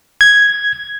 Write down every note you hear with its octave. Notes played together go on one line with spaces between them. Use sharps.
G#6